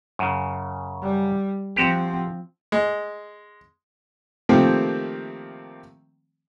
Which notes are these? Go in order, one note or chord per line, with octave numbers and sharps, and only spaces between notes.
F#2 C#3
G3
F3 C4 F#4 G4
G#3
C3 D#3 F3 A3 A#3 C4